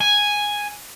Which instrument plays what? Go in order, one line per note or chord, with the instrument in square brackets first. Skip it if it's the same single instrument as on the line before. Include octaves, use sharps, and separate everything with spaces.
[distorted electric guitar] G#5